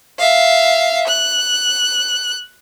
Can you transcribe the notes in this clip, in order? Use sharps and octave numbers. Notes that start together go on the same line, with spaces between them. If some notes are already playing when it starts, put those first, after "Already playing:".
E5 F5
F#6